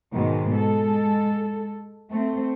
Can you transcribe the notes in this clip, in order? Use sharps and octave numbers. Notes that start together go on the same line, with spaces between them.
G#2 B2 D#3 G#3
G#3 A4
A3 C4